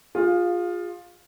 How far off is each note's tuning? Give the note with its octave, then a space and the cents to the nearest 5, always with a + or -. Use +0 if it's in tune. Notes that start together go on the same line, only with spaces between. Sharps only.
F4 +15 G#4 -25 F5 +0